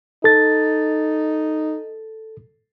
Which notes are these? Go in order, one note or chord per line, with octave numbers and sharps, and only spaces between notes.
D#4 A4 A6